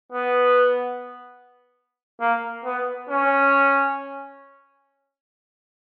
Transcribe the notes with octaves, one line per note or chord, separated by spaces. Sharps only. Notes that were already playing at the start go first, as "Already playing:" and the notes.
B3
A#3
B3
C#4